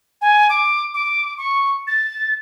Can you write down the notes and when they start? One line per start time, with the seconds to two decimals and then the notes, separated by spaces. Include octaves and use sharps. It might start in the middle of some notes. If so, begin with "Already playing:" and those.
0.21 G#5
0.50 D6
0.94 D6
1.38 C#6
1.87 A6